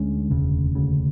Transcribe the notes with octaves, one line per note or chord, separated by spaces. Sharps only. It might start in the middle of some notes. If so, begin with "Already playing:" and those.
Already playing: D2 D3 G#3 C#4
E1 D2 C#3
E1 D2 C#3